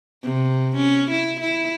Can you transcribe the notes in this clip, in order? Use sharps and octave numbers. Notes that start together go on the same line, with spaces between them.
C3
C#4
E4
E4